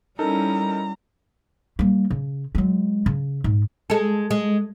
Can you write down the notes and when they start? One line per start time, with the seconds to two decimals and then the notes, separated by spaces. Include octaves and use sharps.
0.19 G3 C#4 D#4 E4 A4 A#4 A#5
1.79 G3 A#3
2.10 C#3
2.55 F#3 G#3
3.06 C#3
3.44 G#2
3.90 G#3 A4
4.31 G#3